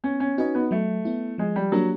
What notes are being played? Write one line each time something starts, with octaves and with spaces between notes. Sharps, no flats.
B3 C#4
C#4
C#4 D#4 F#4 B4 D#5
B3
F#3 A3
B3 E4
F3 G#3
G3
F#3 A#3 D4 G4